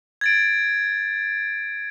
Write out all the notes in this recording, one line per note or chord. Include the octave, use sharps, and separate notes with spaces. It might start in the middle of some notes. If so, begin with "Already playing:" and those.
G#6 A6 D7